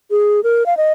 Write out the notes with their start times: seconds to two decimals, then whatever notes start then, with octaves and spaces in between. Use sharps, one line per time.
0.11 G#4
0.44 A#4
0.66 F5
0.77 D#5